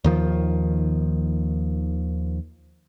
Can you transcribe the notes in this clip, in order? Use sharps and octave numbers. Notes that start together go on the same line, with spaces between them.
D#2 D#3 F3